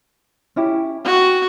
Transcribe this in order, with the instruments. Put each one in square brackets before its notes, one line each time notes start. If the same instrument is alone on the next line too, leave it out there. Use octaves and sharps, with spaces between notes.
[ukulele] C#4 E4 G4
[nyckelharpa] F#4 [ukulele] G5